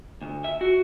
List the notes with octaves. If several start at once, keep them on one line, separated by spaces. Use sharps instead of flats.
D2
E5
F#4